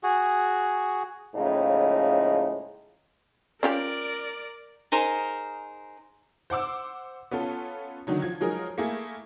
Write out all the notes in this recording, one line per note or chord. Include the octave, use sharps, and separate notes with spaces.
F#4 G#4
A2 C#3 F3 G#3 A#3 D#4
C#4 F4 G4 A#4 D5
D#4 G#4 A#4 C5
C5 F#5 D6 E6
B3 C#4 F4 A4
D3 D#3 F#3 D#4
F3 G#6
F3 F#3 G#3 D#4 G#4 A#4
A3 A#3 E4 G#4